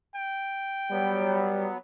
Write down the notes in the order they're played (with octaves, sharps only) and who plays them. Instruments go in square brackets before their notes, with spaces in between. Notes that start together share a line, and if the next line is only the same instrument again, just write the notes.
[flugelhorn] G5
[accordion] F#3 B3 [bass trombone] G3